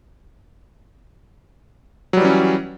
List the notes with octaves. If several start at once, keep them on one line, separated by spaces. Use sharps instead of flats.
E3 F#3 G3 C#4